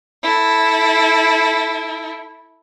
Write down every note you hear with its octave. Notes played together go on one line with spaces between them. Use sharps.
E4 A4